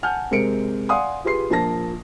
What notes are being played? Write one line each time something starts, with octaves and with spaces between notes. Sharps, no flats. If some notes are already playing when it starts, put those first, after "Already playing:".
F#5 G#5 A5 F6 G6
C3 G#3 A#4 C#7 D7
D5 F5 F#5 G#5 C6 D#6
F4 G4 G#4 B4 C6 C7
A#1 F3 A#3 A5 A#6